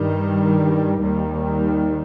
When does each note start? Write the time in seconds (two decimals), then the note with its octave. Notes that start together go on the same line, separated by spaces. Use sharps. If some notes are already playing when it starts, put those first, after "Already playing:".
Already playing: G2 D#3 G3
1.02 D#2 D#3 G3